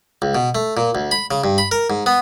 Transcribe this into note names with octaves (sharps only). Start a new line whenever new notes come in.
C#2
B2
A3
A#2
D2
B5
C#3
G2
B5
A#4
G#2
B3